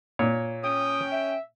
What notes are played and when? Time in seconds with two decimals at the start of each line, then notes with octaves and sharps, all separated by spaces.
0.19 A#2 C#5
0.64 C#4 G5 D#6
1.12 E5